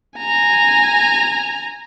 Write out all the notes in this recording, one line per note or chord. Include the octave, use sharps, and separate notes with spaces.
G#5 A#5